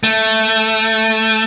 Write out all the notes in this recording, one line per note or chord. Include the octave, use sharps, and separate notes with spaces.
A3